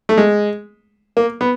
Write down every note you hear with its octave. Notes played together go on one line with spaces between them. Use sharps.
A3
G#3
A#3
B3